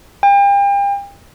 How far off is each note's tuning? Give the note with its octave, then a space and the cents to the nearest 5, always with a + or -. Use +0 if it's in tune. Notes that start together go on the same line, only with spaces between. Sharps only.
G5 +40